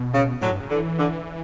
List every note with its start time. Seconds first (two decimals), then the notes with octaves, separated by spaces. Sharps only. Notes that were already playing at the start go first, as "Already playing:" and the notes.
Already playing: B2
0.13 C#3
0.41 A2 D3 F#3
0.51 G2
0.60 C#3
0.70 D3 E3
0.98 D3